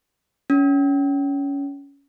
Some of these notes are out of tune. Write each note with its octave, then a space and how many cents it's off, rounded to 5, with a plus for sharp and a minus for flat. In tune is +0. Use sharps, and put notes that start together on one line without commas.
C#4 +20